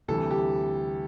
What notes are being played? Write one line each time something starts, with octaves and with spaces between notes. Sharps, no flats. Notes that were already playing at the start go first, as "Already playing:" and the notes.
D2 C3 E3 G3 A4
G4